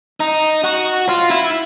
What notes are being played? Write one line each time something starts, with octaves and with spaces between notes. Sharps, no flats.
D#4
F#4
F4
E4